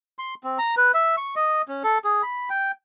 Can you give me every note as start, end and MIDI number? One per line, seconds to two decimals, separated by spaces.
0.19 0.34 84
0.44 0.58 60
0.59 0.75 82
0.77 0.92 71
0.94 1.16 76
1.17 1.35 85
1.36 1.62 75
1.68 1.83 61
1.84 1.98 69
2.04 2.22 68
2.23 2.49 83
2.50 2.72 79